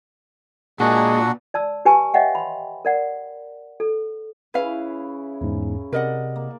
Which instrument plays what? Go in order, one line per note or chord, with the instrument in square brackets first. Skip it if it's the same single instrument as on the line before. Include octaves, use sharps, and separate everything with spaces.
[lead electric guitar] A#2 [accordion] G#3 G#4 [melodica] D4 F#4 F#5
[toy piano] D5 A5 E6
G4 B4 G#5 A5 C#6
C#5 D#5 E5 F#5 G5
B5 C6
A#4 D5 F#5
A4
[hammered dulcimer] C#3 C#4 E4 [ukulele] B4 F5
[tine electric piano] E2 G#2 [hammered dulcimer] A#4
[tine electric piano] C3 [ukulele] A#4 D#5 F#5 [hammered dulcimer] D5 D6
[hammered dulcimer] A#3